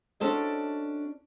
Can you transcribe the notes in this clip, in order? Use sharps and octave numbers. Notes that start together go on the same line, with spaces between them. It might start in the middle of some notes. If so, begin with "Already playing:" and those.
C#4 D4 F#4 A4 C5 D#5